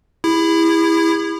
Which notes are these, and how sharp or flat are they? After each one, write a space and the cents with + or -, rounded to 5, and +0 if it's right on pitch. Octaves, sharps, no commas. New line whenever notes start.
E4 +0 G#4 -45